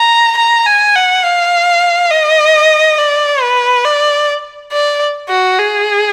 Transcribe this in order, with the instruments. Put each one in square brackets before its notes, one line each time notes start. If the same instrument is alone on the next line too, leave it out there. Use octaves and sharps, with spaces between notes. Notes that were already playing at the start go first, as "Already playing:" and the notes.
Already playing: [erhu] A#5
A#5
G#5
F#5
F5
D#5
D5
B4
D5
D5
F#4
G#4